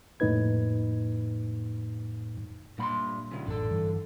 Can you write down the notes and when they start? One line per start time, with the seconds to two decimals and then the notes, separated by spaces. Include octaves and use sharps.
0.20 F2 A2 A#3 D#4 B4 G#6
2.78 G2 A#2 B5 C6
3.31 C#3 F3
3.46 A1 F#2 D3 A4
3.70 G2 E3